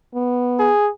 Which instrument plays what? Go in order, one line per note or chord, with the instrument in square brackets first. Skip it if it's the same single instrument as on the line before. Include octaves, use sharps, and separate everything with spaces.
[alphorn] B3
[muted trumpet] G#4